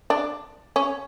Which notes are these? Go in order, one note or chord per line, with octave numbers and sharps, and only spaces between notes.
D4
C#4